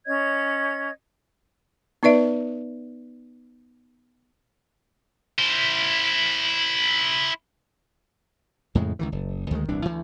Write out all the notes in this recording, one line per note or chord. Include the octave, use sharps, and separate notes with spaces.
C#4 C#5 D#5 G#6
B3 D#4 B4 D5 E5
E4 C5
F2 A2 C#3 G#3
C#2 D#3 E3
F#1
D2 D#3 E3 G#3
D#1 C2 E3 D4
D2 E3